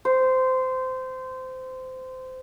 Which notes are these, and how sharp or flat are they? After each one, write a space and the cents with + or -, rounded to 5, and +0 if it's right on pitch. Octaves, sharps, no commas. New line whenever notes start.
C5 -20